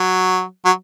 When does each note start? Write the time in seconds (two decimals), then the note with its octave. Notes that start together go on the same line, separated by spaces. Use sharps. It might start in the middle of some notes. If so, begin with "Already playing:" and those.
Already playing: F#3
0.65 F#3